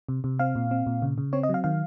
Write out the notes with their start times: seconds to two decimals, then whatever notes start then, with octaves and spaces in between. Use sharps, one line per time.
0.09 C3
0.24 C3
0.39 C4 F5
0.55 A#2
0.71 C4
0.87 A#2
1.02 C#3
1.18 C#3
1.33 C4 C#5
1.43 D#5
1.49 F#3 F5
1.64 D#3 F5